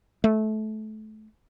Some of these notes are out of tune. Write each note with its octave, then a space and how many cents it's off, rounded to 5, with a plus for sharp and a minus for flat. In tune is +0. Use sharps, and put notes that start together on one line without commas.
A3 -25